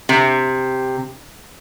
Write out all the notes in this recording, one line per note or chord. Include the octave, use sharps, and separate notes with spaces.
C3